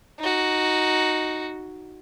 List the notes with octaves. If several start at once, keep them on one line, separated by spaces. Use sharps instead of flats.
D#4 F#4